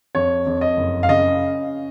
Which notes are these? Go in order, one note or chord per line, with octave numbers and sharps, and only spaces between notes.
F2 C#5
F2
D#5
F#1
F5
C#3 D#5